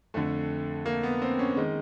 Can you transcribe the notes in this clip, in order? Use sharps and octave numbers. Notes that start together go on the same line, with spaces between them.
F2 D3 A3
A#3
B3
C4
C#4
D#3 G#3